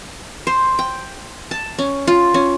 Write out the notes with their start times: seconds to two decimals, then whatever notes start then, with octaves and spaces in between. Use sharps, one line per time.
0.47 C5
0.79 G5
1.51 A5
1.79 C#4
2.07 F4
2.34 C#4